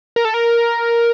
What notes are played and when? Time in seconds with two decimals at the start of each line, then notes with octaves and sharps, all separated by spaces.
0.16 A#4
0.25 A4
0.34 A#4